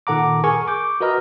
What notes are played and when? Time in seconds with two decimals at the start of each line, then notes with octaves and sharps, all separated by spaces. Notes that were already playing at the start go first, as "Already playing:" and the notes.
0.07 A#2 D#3 A4 F#5 A#5 D6
0.44 G#4 A#4 G#5 C#6
0.67 C#6 D6 G6
1.01 F#4 A#4 B4 D#5 A#5 F6